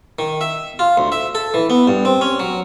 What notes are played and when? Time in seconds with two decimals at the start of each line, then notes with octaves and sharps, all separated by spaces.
0.19 D#3
0.41 E5
0.79 F4
0.97 D2
1.12 E5
1.35 A4
1.54 E3
1.70 B3
1.87 G2
2.05 C4
2.21 C#4
2.40 F#3